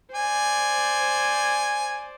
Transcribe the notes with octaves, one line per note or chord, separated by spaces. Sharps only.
C5 D5 G#5